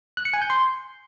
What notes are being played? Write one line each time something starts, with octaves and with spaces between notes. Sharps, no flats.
F#6
C#7
G#5
G6
C6